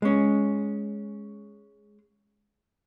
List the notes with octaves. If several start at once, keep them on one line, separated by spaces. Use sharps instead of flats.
G#3 C#4